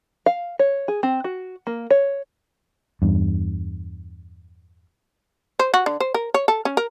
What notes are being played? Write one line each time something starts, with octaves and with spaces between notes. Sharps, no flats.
F5
C#5
G#4
C4
F#4
A#3
C#5
E2 G2
C5
F#4
D3
C5
A#4
C#5
A4
C#4
A#4